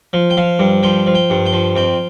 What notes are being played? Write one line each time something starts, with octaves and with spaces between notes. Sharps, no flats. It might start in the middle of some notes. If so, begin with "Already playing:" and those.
F3
G5
F3 F5
G2
F3 G5
F3
G5
G2
G5
F3
F2 G5